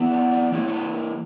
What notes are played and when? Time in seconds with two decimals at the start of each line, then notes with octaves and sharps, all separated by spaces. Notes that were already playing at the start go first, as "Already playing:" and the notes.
Already playing: E3 B3 E4
0.12 D5
0.31 D5
0.52 E3 A#3 E4 C#5
0.68 C#5
0.73 B4
0.93 A#4